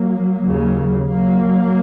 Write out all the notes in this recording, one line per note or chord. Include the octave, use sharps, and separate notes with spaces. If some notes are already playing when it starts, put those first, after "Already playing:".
Already playing: F#3 A#3
D#2 C#3
F#3 A#3